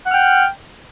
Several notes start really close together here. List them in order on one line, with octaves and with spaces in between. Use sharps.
F#5 F6 G5